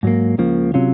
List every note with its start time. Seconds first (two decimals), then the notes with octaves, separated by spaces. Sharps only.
0.03 G#2 F#3 A#3
0.38 C#2 C#3 F3 A#3
0.74 C3 F#3 C#4 F4